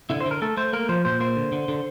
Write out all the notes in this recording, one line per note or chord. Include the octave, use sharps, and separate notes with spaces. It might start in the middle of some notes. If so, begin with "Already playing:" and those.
D3 E4
C5
D3
A#4
A3 A4
A3 C5
A#3 A#4
F3 C5
A#2 C5
A#3 C5
D3
D3
D3